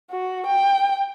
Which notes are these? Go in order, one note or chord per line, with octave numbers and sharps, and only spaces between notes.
F#4
G5